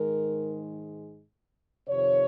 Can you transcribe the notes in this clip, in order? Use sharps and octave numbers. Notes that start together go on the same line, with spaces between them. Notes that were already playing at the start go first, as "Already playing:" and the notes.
Already playing: G#2 D#3 G#3 A#4
F2 C3 D#3 C#5